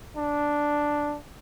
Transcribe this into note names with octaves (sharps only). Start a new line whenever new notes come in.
D4